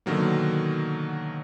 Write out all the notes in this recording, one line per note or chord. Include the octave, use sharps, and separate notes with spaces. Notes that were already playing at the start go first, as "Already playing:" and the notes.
B2 D3 D#3 F#3 A#3